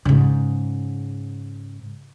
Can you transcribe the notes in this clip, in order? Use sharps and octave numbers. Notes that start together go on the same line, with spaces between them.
G#2 C#3